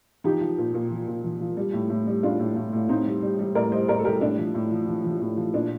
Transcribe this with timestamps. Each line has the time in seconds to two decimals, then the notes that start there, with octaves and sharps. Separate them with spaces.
0.24 F3 D#4 G4
0.41 F3
0.58 A#2
0.74 A#2
0.91 F3
1.07 A#2
1.24 F3
1.41 F3
1.57 G3
1.73 A2
1.90 A2
2.07 G3
2.23 A2 D4 F4
2.40 A2
2.56 A2
2.73 A2
2.89 A2 C4 D#4
3.06 G3
3.22 G3
3.39 G3
3.55 A2 A#4 D5
3.72 G3 C5 D#5
3.89 A2 A#4 D5
3.99 A4
4.05 G3 G4 A#4
4.21 A2 D4
4.38 F3
4.55 A2
4.71 F3
4.88 F3
5.04 F3
5.21 A2
5.37 F3
5.54 A#2 D4